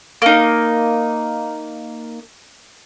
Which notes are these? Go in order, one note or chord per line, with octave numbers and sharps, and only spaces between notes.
A#3 D#4